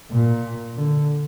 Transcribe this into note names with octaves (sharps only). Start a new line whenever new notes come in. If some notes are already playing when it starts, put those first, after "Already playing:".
A#2
D3